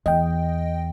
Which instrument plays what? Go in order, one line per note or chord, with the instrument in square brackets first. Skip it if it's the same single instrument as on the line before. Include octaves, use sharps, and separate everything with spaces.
[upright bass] E2 [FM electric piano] D#5 G5